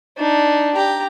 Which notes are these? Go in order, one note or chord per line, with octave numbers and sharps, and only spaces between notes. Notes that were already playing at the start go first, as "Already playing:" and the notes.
D4 D#4
G4 A#5